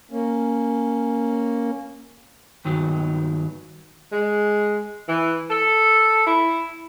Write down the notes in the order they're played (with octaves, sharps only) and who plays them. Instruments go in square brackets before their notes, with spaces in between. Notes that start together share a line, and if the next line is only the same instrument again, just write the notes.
[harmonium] A#3 C#4
[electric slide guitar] G2 D#3 F#3
[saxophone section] G#3
E3
A4
E4